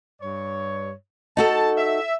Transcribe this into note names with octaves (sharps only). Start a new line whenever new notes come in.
G2 C#5
D#4 F#4 A4 A5
E5